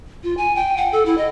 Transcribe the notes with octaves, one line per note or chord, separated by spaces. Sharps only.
F4
G#5
G5
F#5
A4
E4
D#5